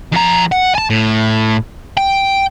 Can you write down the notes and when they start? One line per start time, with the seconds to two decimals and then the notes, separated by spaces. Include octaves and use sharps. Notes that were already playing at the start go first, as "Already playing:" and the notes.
0.12 F2 A#5
0.52 F#5
0.75 G#5 A5
0.90 A2
1.97 G5